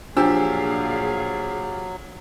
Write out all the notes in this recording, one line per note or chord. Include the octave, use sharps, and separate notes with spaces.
A#2 F3 F#3 D4 G4 G#4 F5 E6